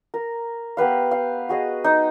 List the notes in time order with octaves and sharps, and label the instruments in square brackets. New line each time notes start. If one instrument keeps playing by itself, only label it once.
[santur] A#4
B3 G4 B4 F5
F5
F#4 G#4 D#5
D#4